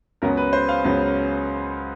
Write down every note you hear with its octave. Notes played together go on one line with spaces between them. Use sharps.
C#2 C#3 F#3 B3 A#4
B4
C5
F5
C#2 C#3 F#3 B3